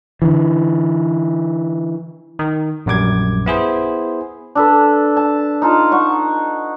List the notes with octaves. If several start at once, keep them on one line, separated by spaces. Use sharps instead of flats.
D3 E3
D#3
A#1 F#2 G3 D6 G#6
B3 E4 G#4 C5
D4 A4 B4
A5
D#4 F4 A5
F#5 C#6